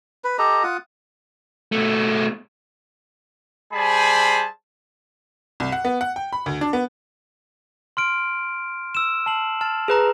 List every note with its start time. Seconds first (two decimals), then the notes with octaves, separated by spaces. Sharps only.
0.24 B4
0.39 G4 A4 D#5 A#5
0.63 F4 F#5 D#6
1.72 B2 A3
3.73 G3 G#4 C5 G#5 A5 B5
5.60 C2
5.72 F#5
5.85 B3
6.01 F#5
6.16 G5
6.33 B5
6.46 D2
6.61 D4
6.73 B3
7.97 C6 F6 D7
8.95 E6 E7
9.26 A5 C7 F#7
9.61 A5 F6
9.88 G#4 B4 A#5